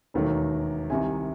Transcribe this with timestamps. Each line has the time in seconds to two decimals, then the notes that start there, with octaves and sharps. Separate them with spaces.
0.14 E1 D#2 D#3 F#3 A3
0.90 C2 C3 D#3 G#5